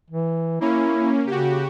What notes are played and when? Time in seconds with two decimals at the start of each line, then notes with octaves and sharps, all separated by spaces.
0.11 E3
0.61 A#3 C#4 E4
1.27 C#3 F#4 G4